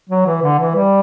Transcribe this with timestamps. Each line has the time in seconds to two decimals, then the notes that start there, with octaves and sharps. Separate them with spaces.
0.10 F#3
0.26 E3
0.42 D3
0.59 E3
0.75 G3